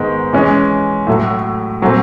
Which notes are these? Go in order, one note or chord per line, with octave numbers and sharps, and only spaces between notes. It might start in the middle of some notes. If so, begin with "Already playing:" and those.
Already playing: G#2 D#3 G#3 B3
E3 G#3 C#4
A2 F#3 A3
A#2 F#3 A3 C4